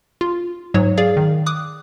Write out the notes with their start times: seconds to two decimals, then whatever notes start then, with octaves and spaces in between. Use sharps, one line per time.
0.21 F4
0.74 G#2 F#3 C#5
0.98 G#4 D5 F5
1.17 D#3
1.46 D6 D#6 F#6